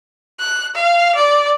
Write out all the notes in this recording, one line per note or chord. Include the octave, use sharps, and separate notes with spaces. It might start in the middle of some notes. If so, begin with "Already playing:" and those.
F#6
F5
D5